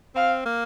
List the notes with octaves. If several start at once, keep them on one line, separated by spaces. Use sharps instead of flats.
C4 F5
A#3